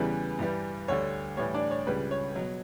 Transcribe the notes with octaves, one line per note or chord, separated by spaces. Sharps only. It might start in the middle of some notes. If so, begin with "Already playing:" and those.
Already playing: E2 C#3 E3 G3 B4
G2 E3 G3
D2 D3 G3 C#5
A2 E3 G3 C#5
D4 D5
C#5
C#2 C#3 G3 B4
C#5
B2 F#3